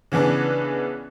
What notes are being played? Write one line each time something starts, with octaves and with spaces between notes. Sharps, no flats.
C#3 E3 B3 C#4 D4